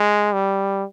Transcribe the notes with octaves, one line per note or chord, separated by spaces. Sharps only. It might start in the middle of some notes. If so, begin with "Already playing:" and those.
Already playing: G#3
G3